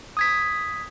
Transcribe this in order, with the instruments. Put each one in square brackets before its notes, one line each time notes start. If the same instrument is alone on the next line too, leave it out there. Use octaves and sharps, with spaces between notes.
[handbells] D#6 G#6 B6